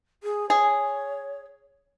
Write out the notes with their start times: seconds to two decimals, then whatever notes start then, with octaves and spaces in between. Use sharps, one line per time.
0.23 G#4
0.50 G#4 C#5